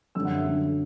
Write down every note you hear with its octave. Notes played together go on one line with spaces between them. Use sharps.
F#2 D3 G3 E6
F#5
E5
F#2 D3 G3